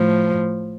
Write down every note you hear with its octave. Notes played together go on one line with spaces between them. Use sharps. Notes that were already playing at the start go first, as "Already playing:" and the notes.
Already playing: A2 F3